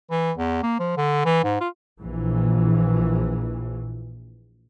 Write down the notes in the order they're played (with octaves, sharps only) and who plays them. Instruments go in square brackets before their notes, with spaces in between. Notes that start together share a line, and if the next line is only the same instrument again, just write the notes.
[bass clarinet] E3
E2
A#3
F3
D3
E3
G#2
F4
[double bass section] A#1 E3